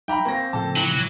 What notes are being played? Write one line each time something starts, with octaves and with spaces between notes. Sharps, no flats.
F#3 D#4 E5 G5 A#5 B5
A#3 C4 G#5 C#6 A#6
A2 C#3 F3 A4 A5
E3 F#3